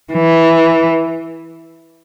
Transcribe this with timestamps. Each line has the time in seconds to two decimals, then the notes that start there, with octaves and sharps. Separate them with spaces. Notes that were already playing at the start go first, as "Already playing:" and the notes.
0.13 E3